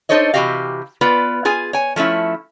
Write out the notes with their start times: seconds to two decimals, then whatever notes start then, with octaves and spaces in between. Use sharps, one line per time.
0.09 D4 D#4 A4 C5 C#5 D#5
0.34 C3 E3 F#4 G4 D#5 F5
1.01 B3 F4 B4 D5
1.45 F4 G#4 G#5
1.73 C#5 G#5
1.96 F3 A3 C#4 E4